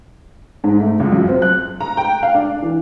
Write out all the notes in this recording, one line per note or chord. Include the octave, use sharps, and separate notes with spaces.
G#2
A3
C#2
F#2
C4
F#6
A#5
G5
F5
D4
E3